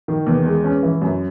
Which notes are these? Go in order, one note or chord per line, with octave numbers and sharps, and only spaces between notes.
D#3
E2
G#3
C#4
E3
F#2